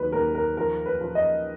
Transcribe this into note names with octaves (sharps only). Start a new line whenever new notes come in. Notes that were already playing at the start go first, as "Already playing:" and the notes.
Already playing: D#2 F#3 B4
D#2 A#4
A#4
F3 A#4
B4
F3
D#5